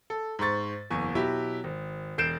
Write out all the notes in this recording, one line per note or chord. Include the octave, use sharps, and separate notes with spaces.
A4
G#2 C5 C#6 A6
F#1 E2 G#5 C#6
B2 F#3 E4 G4
G#1
E1 G6 C7 D7 E7